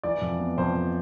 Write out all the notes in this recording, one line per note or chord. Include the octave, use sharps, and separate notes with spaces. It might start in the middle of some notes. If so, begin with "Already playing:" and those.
E3 D5
F2
B3
F2 C5
F2